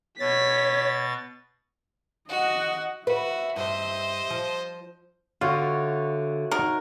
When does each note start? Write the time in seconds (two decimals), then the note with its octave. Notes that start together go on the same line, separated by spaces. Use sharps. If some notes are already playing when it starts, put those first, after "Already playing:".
0.20 B2 C#5 A6 B6
2.29 F#4 D#5 F#5
3.07 F#4 B4 E5
3.56 G2 C5 D#5
4.30 F3
5.41 D3 F4 F#4 C#5 E5
6.51 D#4 A#4 C#5 F#5